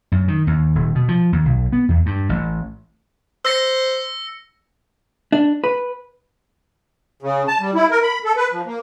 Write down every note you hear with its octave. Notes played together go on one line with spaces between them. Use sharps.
F#2
D#3
D#2
D#1
B2
F3
D#2
B1
B3
E2
G2
A1
C5 E6 A#6 C#7
D4
B4
C#3
A5
G3
E4
A#4
B5
A4
B4
F3
A#3